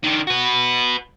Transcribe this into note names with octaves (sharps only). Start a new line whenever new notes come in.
D3 D#3
F#4 B4